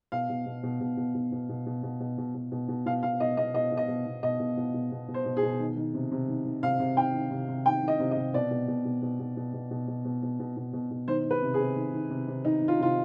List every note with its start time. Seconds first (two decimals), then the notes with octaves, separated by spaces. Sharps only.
0.12 B2 F5
0.29 B2
0.46 B2
0.63 B2
0.81 B2
0.97 B2
1.15 B2
1.32 B2
1.49 B2
1.66 B2
1.83 B2
2.00 B2
2.18 B2
2.35 B2
2.52 B2
2.68 B2
2.86 B2 F5
3.03 B2 F5
3.20 B2 D#5
3.37 B2 D#5
3.54 B2 D#5
3.72 B2
3.77 D#5
3.88 B2
4.06 B2
4.23 B2 D#5
4.40 B2
4.57 B2
4.74 B2
4.92 B2
5.08 B2
5.14 C5
5.26 B2
5.37 G#4
5.43 B2
5.60 D#3
5.77 D#3
5.94 C3
6.11 C3
6.28 D#3
6.45 D#3
6.63 C3 F5
6.79 C3
6.97 D#3 G5
7.14 D#3
7.31 C3
7.48 C3
7.65 D#3 G5
7.83 D#3
7.88 D#5
8.00 C3
8.11 D#5
8.17 C3
8.34 B2 D5
8.51 B2
8.68 B2
8.85 B2
9.02 B2
9.20 B2
9.37 B2
9.54 B2
9.71 B2
9.88 B2
10.05 B2
10.23 B2
10.40 B2
10.57 B2
10.73 B2
10.91 B2
11.08 D#3 C5
11.25 D#3
11.31 B4
11.42 C3
11.54 G#4
11.59 C3
11.76 D#3
11.93 D#3
12.10 C3
12.28 C3
12.45 D#3 D#4
12.62 D#3
12.68 F4
12.79 C3 F4